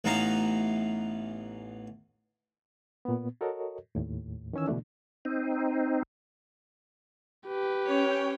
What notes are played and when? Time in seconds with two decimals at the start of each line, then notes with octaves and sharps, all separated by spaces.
0.04 A1 E3 B3 D#4 F5 A#5
3.05 A#2 B3
3.41 F#4 A4 A#4 C#5 D#5
3.95 D#2 A2
4.53 D#3 E3 C#4 G#5 E6
4.68 B2 D3 E3 A3 D4
5.25 C4 D#4
7.48 G4 B4
7.87 C#4 C#5 G5